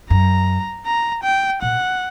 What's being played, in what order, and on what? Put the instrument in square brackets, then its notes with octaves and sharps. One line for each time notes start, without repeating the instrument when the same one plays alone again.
[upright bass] F#2 [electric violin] A#5
[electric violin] A#5
G5
[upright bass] A#2 [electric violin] F#5